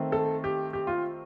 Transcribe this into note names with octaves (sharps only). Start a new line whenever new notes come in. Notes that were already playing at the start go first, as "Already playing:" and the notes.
Already playing: D#3 A3 C4
A4
G4
G4
F4